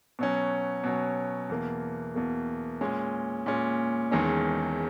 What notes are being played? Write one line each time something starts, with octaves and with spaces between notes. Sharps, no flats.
B2 F#3 C#4
B2 F#3 C#4
E2 B2 A#3
E2 B2 A#3
A#2 G#3 C#4
A#2 G#3 C#4
E1 E2 D#3 G#3 C#4